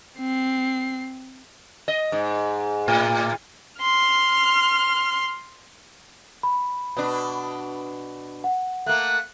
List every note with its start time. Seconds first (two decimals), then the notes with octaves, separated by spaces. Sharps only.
0.18 C4 C7
1.88 D#5
2.12 G#2
2.88 A2
3.82 C6 F6
6.43 B5
6.97 B2 D4
8.44 F#5
8.86 A3 A#3 F#6